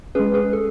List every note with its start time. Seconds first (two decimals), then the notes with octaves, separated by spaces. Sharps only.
0.15 G#3 C#4 G#4 B4
0.34 G#4 B4
0.53 A4